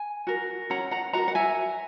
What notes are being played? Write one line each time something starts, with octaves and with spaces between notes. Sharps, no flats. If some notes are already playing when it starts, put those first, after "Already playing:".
Already playing: G#5
F#4 A#4
C#4 F#5 A#5
F#5 A#5
F#4 A#4 F#5 A#5
F#5
E5 G#5